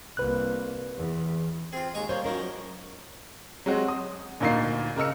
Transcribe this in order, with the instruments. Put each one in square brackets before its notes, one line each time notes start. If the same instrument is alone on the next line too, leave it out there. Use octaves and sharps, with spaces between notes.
[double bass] C2 A#3 [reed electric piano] B4 F#6
[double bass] E2
[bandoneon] C4 [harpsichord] F4 G#4
[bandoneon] D#2 G#3 [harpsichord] A#5 C#6 D#6
[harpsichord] G3 [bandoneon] A#3 [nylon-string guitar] C5 C#5
[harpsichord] D#3 F3 F#3 [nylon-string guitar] C#4 A#4
[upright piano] F#3 G#3 C4 F#4
D#6
D2 A#2 A#3 D#4 C7
C#3 A#4 D#5 E6 C#7